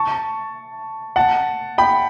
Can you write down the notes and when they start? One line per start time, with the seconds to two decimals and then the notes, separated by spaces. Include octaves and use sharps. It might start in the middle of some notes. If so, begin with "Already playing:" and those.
Already playing: A5 C#6
1.16 F#5 A5
1.78 G5 B5